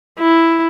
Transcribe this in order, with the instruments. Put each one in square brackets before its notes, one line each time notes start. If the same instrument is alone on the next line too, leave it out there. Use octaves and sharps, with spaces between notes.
[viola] E4